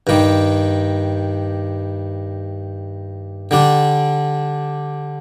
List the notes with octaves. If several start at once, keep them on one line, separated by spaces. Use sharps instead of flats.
G2 D#3 G3
D3 G3 D4